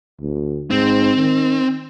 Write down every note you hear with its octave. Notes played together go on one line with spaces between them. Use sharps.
D2
G#2 C4
D#3